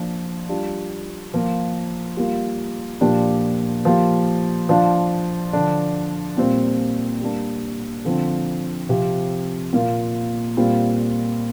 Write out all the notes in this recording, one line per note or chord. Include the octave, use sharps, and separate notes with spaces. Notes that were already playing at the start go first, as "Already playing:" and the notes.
Already playing: F3 A#3 D4 F4
G3 D4 F4
F3 A#3 F4
G3 A#3 F4
A#2 F3 D4 G4
F3 A#3 G4
F3 D4 F4
D3 F3 D4
A#2 G3 C4 F4
G3 A#3 D4
D3 F3 C4 F4
C3 F3 C4 G4
A#2 A#3 F4
A#2 G3 C4 F4